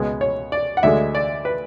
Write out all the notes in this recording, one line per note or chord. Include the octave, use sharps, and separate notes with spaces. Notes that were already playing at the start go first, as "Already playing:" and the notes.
Already playing: C#2 B2 G#3 B3
C#5
D5
F#5
D2 D3 G#3 E5
D5
B4